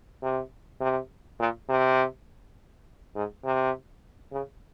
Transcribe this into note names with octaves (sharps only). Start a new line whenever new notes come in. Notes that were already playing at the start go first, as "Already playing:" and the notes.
C3
C3
A#2
C3
G#2
C3
C#3